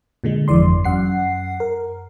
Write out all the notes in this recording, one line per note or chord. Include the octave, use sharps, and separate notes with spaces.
A#2 D3 G#3
G1 F2 E3 D5 C6
F#2 F#5 C7
A#4